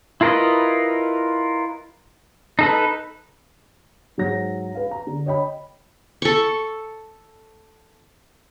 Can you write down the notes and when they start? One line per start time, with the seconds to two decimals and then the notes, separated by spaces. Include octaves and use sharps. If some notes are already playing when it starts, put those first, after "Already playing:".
0.21 E4 F4 A#4 B4 D#5
2.59 D#4 A4 B4
4.18 G#2 F#3 A#6
4.75 B4 F5
4.91 A#5
5.07 D3
5.26 C#5 D#5 G5 B5
6.22 A4 C#6